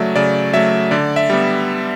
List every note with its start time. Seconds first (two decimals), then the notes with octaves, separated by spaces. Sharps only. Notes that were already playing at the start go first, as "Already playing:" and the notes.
Already playing: C#3 F#3 A3 D5 E5
0.16 C#3 D5
0.54 F#3 A3 E5
0.91 D3 D5
1.16 E5
1.30 G3 B3